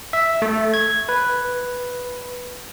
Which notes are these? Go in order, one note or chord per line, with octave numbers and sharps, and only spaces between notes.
E5
A3
G#6
B4